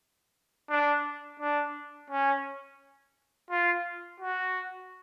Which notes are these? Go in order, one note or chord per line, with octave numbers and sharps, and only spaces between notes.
D4
D4
C#4
F4
F#4